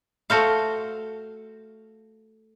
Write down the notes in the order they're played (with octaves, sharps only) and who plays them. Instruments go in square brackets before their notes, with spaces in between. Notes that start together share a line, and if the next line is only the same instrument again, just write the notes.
[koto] A3 F#4 C5 F5